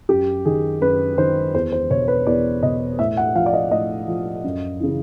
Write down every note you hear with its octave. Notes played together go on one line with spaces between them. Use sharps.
F#2 G4
D#3 G#4
F#2 B4
D#3 C5
E2 C5
C5
B2 C#5
B4
E2 D5
B2 D#5
A2 E5
F#5
F3 F5
D5
D#5
A2 D#5
F3
F#2
C#3 E3